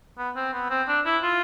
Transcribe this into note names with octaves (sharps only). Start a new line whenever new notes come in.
B3
C4
B3
C4
D4
E4
F4